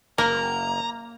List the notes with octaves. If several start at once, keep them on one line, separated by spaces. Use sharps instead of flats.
F#1 A#3 A#4 A#5